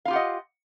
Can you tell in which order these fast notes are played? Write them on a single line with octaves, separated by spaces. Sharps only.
F5 F4 G4 F#5 D#5